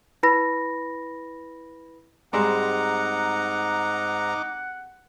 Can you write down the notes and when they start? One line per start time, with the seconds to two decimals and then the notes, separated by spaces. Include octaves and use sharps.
0.23 E4 B4 B5 A#6
2.33 G#2 G3 G#3 C4 D#4 F#5 A#5 D6